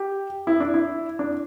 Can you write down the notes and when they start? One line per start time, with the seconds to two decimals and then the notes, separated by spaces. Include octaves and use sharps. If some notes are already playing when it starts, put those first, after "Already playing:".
Already playing: G4
0.47 E4
0.60 D4
0.74 E4
1.19 D4